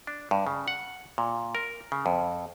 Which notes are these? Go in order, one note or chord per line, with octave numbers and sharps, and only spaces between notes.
D4
G2
C#3
F#5
A#2
A#4
C#3
F2